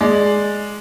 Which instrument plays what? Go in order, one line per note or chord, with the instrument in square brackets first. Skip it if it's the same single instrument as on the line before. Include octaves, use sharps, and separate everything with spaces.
[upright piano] G#3 D5